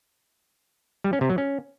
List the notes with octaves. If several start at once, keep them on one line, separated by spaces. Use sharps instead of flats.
G3
C#4
C3
F#3
C#4